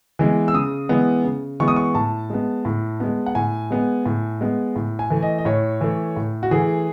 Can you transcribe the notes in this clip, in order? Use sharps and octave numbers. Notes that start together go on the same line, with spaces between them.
E3 G#3 B3
E6
C#3 D#6
E3 G#3 B3
C#3
E3 G#3 B3 C#6
D#6
C#6
A2 A5
G#3 B3
A2
G#3 B3
F#5
A2 G#5
G#3 B3
A2
G#3 B3
A2
G#5
E3 A3
D#5
D#5
A2 C#5
E3 A3
A2
F#4
E3 A3 G#4